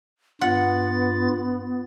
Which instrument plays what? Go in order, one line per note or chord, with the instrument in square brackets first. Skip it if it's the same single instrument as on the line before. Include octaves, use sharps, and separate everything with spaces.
[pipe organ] G2 F4 A6 [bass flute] B3 [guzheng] F#5